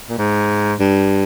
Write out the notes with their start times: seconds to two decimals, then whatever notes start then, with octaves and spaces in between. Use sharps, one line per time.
0.09 A#2
0.18 G#2
0.80 G2